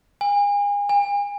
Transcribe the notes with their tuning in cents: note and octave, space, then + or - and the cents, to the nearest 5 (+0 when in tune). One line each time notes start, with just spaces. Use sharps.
G#5 -35
G#5 -45